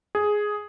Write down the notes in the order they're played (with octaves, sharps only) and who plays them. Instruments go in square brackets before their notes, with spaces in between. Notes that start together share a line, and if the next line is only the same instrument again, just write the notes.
[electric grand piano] G#4